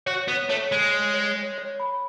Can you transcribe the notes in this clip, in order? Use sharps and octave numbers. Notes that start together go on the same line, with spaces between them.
F#4 C#5
B3 C#5
A3 C#5
G#3 C#5
C#5
C#5
C#5
C#5
B5